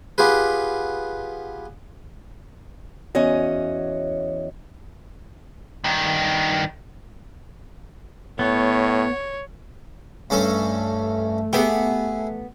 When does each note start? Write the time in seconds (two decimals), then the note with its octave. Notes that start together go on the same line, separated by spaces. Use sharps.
0.18 B3 F4 G4 G#4 B4
3.15 E2 C#4 F#4 C#5 D#5
5.84 G2 D#3
8.39 A2 B3 C#5
10.30 G2 A3 C#4 A4
11.53 B3 E4 G4 G#4